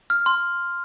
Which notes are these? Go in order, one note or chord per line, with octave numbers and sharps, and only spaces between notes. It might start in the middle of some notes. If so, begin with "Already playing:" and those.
F6
C6